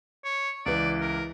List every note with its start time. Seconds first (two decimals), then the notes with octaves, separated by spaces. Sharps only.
0.24 C#5
0.66 C#2 E3 D5
1.01 A#4